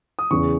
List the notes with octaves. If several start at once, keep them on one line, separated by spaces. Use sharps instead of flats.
D#6
E2 C#3 E3 C#6